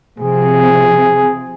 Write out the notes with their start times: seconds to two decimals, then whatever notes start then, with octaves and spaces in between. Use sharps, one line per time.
0.20 C3 F3 C4 G#4